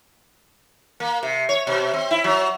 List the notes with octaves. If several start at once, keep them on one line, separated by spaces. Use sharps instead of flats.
A#3
C3
C#5
B2
C4
E4
F#3